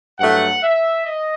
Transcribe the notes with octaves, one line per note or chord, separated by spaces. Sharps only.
G2 F#3 A3 F#5
E5
D#5